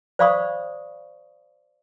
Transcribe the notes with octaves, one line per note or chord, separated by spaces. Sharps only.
C5 D5 F5 B5 C#6 D#6